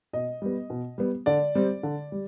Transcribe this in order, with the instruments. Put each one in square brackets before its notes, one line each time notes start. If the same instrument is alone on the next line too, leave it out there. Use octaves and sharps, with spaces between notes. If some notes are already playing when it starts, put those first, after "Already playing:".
[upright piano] B2 D#5
G3 B3
B2
G3 B3
D3 D5
G3 C4
D3
G3